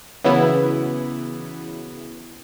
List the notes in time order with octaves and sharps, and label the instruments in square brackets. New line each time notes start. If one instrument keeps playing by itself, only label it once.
[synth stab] C#3 E3 F#3 B3 E4